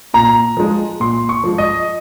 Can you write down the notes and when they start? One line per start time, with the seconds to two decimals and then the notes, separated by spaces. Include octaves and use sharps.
0.14 A#2 A#5
0.57 F3 G#3
1.00 A#2 C6
1.29 C#6
1.44 F3 G#3
1.58 D#5